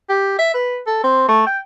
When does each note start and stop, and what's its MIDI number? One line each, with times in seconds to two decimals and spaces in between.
0.09 0.37 67
0.38 0.52 76
0.54 0.78 71
0.87 1.03 69
1.04 1.26 60
1.28 1.43 57
1.46 1.58 79